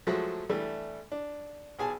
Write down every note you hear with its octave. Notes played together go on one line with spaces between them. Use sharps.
F3 F#3 G#3 A3 F#4
E3 G3 A3 D4
D4
B1 G#4 G#5 A5